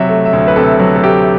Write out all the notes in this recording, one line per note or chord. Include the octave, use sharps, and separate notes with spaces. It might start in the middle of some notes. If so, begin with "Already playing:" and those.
Already playing: C3 F#3 E5
A3
E5
D2
B4
C3 A4
F#3
A4
A3 G4